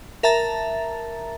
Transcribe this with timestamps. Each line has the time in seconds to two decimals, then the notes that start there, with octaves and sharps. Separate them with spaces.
0.23 A#4 E5 A5 A#5 A6